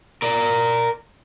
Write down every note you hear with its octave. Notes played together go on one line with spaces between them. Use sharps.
A#4 D5